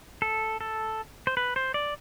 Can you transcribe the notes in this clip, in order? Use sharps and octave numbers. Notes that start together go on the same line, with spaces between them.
A4
A4
C5
B4
C5
D5